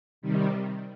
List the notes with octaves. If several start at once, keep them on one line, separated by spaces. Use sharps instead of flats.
C3 D#3 G3